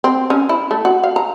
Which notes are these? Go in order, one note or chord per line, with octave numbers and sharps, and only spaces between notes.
C4
C#4
E4
A3
F#4
F5
A#5